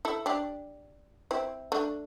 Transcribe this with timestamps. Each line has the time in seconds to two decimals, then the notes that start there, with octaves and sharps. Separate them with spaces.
0.05 E4 A4
0.26 D4 G4
1.31 C4 E4
1.72 A3 D4